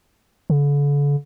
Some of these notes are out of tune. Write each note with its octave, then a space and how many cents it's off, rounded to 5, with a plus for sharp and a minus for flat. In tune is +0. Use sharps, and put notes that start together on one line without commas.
D3 -40